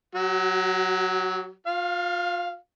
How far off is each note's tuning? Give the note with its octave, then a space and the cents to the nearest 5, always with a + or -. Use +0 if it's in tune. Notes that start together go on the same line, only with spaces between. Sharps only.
F#3 +0 F#4 +40
F4 +30 F5 -5